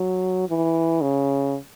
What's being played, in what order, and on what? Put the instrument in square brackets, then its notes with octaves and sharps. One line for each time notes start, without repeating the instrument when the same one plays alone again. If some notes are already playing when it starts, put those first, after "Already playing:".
Already playing: [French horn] F#3
E3
C#3